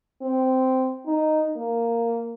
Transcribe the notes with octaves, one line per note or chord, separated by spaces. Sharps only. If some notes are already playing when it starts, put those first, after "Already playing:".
C4
D#4
A#3